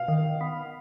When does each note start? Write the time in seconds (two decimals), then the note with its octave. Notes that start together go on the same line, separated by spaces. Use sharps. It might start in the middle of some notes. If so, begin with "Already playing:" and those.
Already playing: B2 F5
0.08 D#3
0.41 B3